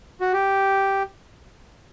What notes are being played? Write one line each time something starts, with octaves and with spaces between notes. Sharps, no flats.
F#4
G4